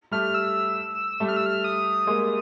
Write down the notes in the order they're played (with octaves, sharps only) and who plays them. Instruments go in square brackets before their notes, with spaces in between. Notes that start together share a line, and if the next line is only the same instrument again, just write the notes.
[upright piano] G3 A3 [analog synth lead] F6
[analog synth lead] E6
[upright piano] G3 A3
[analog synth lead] F6
E6
F6
D#6
[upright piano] G#3 A#3